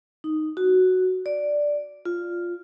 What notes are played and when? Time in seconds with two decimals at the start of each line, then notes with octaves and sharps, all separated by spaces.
0.24 D#4
0.57 F#4
1.26 D5
2.05 F4